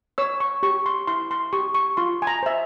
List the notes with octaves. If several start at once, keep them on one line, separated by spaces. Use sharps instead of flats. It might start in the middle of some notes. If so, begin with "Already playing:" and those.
C#5 E6
C#6
G4 C#6
C6
E4 C6
C6
G4 C#6
C#6
F4 C6
G#5
A#5
C5 E5